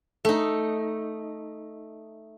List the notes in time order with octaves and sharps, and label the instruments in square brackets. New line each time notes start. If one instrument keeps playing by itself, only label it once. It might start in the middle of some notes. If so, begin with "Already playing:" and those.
[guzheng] A3 D#4